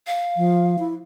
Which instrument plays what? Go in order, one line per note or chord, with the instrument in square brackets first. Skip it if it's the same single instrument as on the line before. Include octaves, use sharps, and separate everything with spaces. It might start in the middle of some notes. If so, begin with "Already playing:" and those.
[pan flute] F5
[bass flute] F3
E4